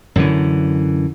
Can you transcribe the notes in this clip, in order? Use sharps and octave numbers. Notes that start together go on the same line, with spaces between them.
F#2 D3 E3